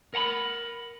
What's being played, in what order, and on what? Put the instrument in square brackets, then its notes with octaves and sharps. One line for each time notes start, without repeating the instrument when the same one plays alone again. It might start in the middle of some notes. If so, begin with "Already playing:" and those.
[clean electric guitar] A#4 F#5 A#5 B5